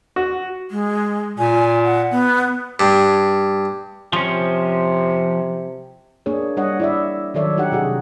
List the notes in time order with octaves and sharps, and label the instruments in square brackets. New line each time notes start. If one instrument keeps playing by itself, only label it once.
[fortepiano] F#4
[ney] G#3
[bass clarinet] A#2 [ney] G#5
[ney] F#5
B3
[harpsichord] G2
[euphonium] C3 [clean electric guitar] F3 C#4
[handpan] A#3 D4 G#4 C#5
G3 D4 C#5 D#5 F#5
E4 D5 E5
D#3 F#3 A4 C#5 D5 E5
D4 D#4 G4 F#5
C3 F#4 G#4